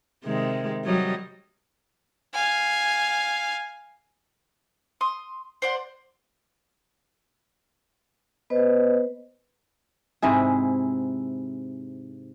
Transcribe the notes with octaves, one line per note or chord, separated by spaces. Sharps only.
C3 D#3 G#3
F#3 G3 D#5
F5 G#5
C6 D#6
C5 D5 F#5
B3 B4 C5 D#5
G#2 C3 E4 G#4